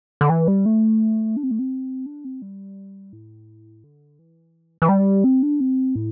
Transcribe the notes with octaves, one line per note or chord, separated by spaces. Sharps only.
D3
E3
G3
A3
D4
C4
A3
C4
D4
C4
G3
A2
D3
E3
E3
G3
C4
D4
C4
A2